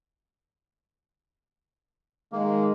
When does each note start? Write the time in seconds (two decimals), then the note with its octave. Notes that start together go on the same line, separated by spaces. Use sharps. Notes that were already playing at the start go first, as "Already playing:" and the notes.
2.32 D#3 G#3 A#3